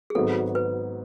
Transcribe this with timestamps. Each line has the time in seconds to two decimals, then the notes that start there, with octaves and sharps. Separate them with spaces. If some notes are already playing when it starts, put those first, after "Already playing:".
0.10 G#4
0.15 G#1 G#2 F#3 B3 A4
0.55 B4